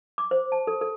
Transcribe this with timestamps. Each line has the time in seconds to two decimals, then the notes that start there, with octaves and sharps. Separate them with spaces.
0.18 D6
0.31 C5
0.52 A5
0.67 A4
0.81 A4